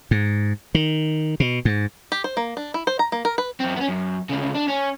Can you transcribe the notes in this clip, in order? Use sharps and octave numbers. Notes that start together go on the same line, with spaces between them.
G#2
D#3
B2
G#2
G4
C5
A#3
D4
E4
C5
A#5
A#3
A#4
B4
F#2 C4
B3 C#4
F#2
D2 C#3
D4
C#4